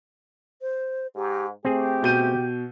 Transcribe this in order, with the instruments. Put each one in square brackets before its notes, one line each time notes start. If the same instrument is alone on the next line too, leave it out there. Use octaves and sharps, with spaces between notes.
[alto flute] C5
[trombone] G#2 [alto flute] G4
[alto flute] A3 [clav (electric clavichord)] C4 G#4 [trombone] G4
[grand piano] B2 G6 D#7